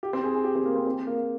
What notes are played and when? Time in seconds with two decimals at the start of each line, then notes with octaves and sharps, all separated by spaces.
0.03 G4
0.13 C4
0.24 G#4
0.34 G#4
0.44 G4
0.55 C4
0.65 A#3
0.75 C4
0.86 C4
1.07 A#3